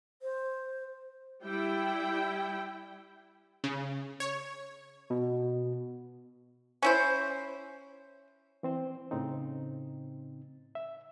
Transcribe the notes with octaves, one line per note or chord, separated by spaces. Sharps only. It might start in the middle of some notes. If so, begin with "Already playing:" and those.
C5
G3 E4 G5
C#3
C#5
B2
C#4 E4 C5
E3 C4 C5
A2 C#3 C4 D#4
E5